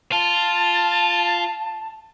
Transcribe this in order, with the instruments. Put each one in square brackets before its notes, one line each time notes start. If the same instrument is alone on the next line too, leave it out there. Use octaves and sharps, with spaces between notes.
[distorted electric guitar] F4 [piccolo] A5